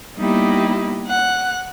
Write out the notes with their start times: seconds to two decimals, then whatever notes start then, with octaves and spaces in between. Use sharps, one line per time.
0.16 G3 A#3 B3 D#4 E4 G4
1.06 F#5 F#6